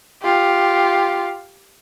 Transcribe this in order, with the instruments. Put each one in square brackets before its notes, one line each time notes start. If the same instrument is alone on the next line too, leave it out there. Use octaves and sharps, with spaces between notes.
[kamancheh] F4 G4